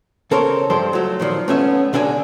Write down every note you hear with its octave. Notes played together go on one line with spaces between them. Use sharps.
C#3 A4 A#4 C5 C#5
G2 F3 A4 C5
F#3 A3
A#2 D#3 F3
A3 B3 C#4 E5
B2 D3 D4 D#5 G#5